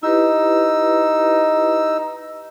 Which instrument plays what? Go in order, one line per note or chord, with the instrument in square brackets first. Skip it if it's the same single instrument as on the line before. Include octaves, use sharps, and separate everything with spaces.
[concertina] D#4 E6 [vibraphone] E4 G4 B4